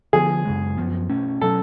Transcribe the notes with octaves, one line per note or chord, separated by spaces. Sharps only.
D3 F3 B3 G#4
F#2 C#3 G#3
F#2 F3 B3
B2 A3 C#4
B2 F#3 C#4 A4